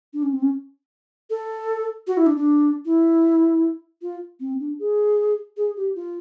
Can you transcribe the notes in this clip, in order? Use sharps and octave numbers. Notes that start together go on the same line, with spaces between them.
D4
C#4
C4
C#4
A4
F#4
E4
D4
D4
E4
F4
C4
D4
G#4
G#4
G4
F4